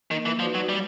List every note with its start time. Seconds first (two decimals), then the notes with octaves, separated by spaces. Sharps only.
0.11 D#3 A#3
0.26 E3
0.40 F3 D#4 F#4 B4 D5
0.55 F#3
0.69 G3 G#3